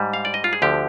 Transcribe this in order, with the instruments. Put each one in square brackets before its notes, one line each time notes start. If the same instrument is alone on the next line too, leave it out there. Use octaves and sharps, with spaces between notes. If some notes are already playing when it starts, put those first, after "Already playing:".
Already playing: [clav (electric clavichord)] G#2 G3
F5
D5
D#5
F4
G#4
D2 D3 F3 G4